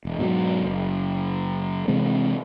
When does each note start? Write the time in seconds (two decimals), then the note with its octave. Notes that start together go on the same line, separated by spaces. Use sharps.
0.05 E1
0.18 G#2 B2 D3 F#3
0.63 F#1
1.88 C3 E3 G#3 C4